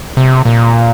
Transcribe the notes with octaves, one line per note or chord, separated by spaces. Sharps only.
C3
A#2